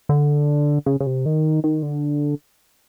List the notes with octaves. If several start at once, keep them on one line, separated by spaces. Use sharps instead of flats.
D3
C#3
C#3
C3
D#3
D#3
D3